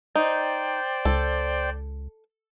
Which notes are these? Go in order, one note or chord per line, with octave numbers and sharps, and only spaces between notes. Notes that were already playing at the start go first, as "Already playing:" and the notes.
D#4 C5 D5 G5
C#2 A4